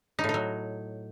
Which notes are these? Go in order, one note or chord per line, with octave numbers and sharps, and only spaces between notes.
D#4
A2
D#4
F#3